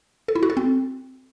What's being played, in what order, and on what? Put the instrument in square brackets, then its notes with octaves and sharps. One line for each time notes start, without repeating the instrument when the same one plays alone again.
[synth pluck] A4
E4
F#4
A4
C4